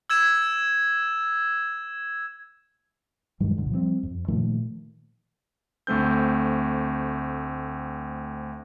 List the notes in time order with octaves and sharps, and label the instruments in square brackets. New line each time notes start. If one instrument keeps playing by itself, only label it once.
[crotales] E6 G#6 E7
[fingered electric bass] G2 D#3 F#3 G#3
F#1 C2 A#2 D3
F3 G3 G#3 C4
F2
A#2 D#3 F3 A3
[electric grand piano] D2 A3 C4 G6